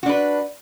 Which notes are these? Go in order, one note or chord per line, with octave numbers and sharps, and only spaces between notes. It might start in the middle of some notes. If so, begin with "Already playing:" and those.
D4 F#4 B4